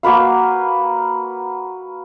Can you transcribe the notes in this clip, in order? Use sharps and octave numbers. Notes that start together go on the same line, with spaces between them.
A#3 F#4 B4 F5